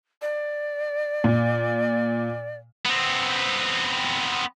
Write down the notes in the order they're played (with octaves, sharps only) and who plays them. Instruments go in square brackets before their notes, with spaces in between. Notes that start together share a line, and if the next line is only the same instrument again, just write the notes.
[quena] D5
[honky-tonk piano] A#2
[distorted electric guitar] B3 C4